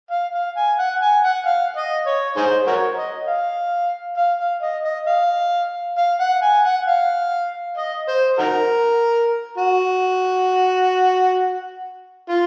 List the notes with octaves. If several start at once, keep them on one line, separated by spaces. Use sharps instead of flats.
F5
F5
G#5
F#5
G#5
F#5
F5
D#5
C#5
D#4 G#4 C5
F#4 A#4 C#5
D#5
F5
F5
F5
D#5
D#5
F5
F5
F#5
G#5
F#5
F5
D#5
C5
D#4 F#4 A#4
F#4
F4